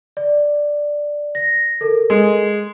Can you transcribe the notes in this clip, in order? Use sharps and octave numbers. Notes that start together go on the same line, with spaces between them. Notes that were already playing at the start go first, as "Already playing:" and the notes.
D5
A#6
A4 A#4
G#3